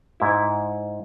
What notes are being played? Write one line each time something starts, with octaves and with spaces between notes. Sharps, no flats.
G#2 E4